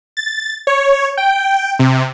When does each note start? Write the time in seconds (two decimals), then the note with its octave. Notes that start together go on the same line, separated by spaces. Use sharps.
0.17 A6
0.67 C#5
1.17 G5
1.79 C3